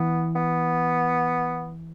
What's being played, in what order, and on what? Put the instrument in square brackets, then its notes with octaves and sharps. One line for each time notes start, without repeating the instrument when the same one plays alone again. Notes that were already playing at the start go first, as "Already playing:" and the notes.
Already playing: [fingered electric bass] E3 [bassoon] B3
[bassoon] B3